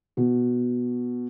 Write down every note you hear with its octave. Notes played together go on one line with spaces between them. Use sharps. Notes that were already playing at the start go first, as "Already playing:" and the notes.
B2